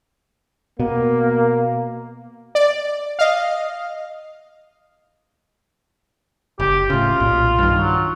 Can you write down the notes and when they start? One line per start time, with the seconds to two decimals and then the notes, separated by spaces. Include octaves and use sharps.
0.80 B2 A#3
2.55 D5
3.19 D#5 F5
6.60 F#1 G4
6.90 A2 C#3 F4
7.20 B1 A#2
7.59 G2 D#3
7.78 F#3